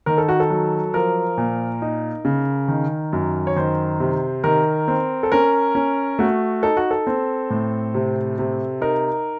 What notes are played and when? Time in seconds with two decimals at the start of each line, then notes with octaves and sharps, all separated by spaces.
0.06 D#3 A#4
0.18 A4
0.29 F#4
0.40 A4
0.50 F#3
0.94 F3 A#4
1.37 A#2
1.82 D#4
2.25 C#3
2.68 D#3
3.13 F#2
3.47 C#5
3.56 D#3 C5
4.00 C3
4.44 D#3 A#4
4.88 C4
5.23 A4
5.32 C#4 A#4
5.75 C#4
6.19 A3 F#4
6.63 D#4 A4
6.77 F#4
6.91 A4
7.07 C4
7.50 A2
7.94 C3
8.38 C3
8.81 D#4 A#4